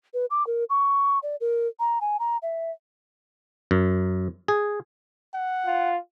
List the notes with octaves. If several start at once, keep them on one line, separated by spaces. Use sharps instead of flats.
B4
D6
A#4
C#6
D5
A#4
A#5
G#5
A#5
E5
F#2
G#4
F#5
F4